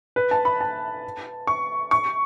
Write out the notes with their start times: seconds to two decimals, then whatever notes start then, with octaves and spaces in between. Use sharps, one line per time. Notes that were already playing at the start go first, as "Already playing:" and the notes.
0.16 B4
0.31 A5
0.45 B5
0.61 A5
1.47 C#6
1.91 C#6